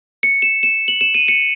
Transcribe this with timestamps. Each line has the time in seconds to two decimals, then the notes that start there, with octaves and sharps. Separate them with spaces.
0.23 C#7
0.42 E7
0.63 E7
0.88 F#7
1.01 E7
1.15 D#7
1.28 C#7